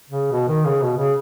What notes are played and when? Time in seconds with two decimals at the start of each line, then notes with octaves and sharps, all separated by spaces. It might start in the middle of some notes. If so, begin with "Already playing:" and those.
0.09 C#3
0.31 B2
0.48 D#3
0.65 C#3
0.82 B2
0.97 C#3